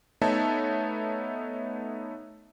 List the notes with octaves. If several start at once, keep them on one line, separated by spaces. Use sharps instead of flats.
A3 B3 D#4 C#5 E5 A5